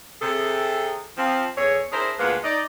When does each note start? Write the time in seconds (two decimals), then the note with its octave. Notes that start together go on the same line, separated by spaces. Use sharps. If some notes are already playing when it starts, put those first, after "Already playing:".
0.21 C3 G#4 A4
1.18 F3 C4
1.56 E2 G#4 A4 C#5
1.92 D4 E4 G#4 A#4 C5
2.19 D2 G#3 A#3 F4 B4 F#5
2.44 D#4 D5 D#5